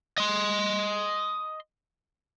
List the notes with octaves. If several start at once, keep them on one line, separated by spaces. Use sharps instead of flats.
D#5 C6